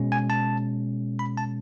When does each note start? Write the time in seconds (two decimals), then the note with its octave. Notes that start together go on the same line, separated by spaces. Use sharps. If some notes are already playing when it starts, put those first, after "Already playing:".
Already playing: B2 G#3 C#4
0.12 G#5
0.30 A5
1.19 B5
1.37 A5